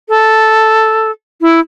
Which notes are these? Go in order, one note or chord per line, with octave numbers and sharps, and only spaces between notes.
A4
E4